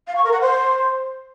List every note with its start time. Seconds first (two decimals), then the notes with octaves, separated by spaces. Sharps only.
0.07 F5
0.16 C#6
0.24 A#4
0.33 F#5
0.41 C5